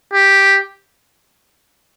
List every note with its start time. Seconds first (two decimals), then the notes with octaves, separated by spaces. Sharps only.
0.14 G4